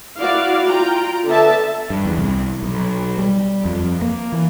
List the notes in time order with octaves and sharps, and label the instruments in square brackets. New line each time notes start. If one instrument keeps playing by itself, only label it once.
[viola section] E4 F#4 D5 F5
F4 G5 A#5
D3 B3 E5 A5
[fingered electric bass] G2
E2
C2
B1
G3
F2
A#3
E3